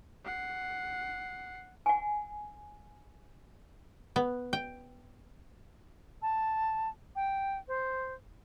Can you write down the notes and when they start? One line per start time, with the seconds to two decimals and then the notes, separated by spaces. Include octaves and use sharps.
0.24 F#5 C7
1.86 F#5 G#5
4.16 B3
4.53 G5
6.22 A5
7.16 G5
7.68 C5